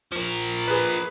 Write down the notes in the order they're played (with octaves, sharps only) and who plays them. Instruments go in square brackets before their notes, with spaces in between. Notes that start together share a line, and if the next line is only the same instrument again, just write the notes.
[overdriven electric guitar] F3 A#4
[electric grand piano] G#4 B4